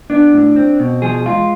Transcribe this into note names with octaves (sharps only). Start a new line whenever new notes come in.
B3 D4
A2
C4
B2
F3 G#4
G#3 F4